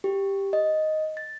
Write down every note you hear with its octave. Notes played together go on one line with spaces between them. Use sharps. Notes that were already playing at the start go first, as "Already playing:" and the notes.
G4
D#5
A6